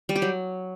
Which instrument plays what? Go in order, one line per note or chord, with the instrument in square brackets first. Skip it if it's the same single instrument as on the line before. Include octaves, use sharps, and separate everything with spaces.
[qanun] G3
G4
F#3